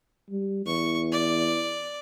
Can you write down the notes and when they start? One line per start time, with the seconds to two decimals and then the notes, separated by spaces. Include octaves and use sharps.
0.30 G3
0.66 E2 C#6
1.12 D5